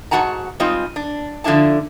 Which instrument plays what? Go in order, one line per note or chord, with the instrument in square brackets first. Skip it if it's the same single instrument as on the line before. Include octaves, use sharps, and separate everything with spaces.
[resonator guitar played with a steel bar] G#2 C3 F#4 F#5 A5 A#5
G3 G#3 C4 D#4 F4
D4
D3 F3 D4 E4 A5